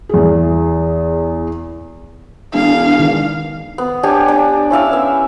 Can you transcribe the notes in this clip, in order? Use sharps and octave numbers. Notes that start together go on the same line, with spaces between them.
E2 G#4
E1 B3 D4 G#4 F5
D#3
B3
D4 G4 C#5 G#5
D4
C#4 E4 F5 E6
B3 E5